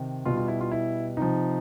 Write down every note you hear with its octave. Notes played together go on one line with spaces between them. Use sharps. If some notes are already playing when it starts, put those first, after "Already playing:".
Already playing: C3 D#3
B2 G3 F4
F4
E4
F4
E4
C3 F3 D#4